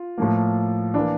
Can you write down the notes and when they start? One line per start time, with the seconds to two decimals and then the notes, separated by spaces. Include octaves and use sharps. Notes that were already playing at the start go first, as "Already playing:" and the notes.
Already playing: F4
0.18 A2 F3 A#3
0.94 E3 A#3 D4